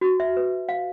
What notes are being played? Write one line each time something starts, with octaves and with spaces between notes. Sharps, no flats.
F#4
E5
B4
F5